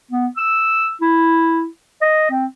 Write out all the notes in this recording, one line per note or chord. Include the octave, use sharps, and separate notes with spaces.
B3
E6
E4
D#5
C4